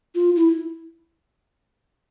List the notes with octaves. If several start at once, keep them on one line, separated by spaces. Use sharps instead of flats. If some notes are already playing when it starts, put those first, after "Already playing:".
F4
E4